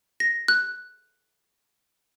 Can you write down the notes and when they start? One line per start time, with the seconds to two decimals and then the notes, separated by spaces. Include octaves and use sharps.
0.20 A#6
0.48 F#6